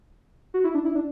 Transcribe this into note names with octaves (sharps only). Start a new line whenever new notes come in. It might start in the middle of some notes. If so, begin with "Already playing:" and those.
F#4
E4
D4
E4
D4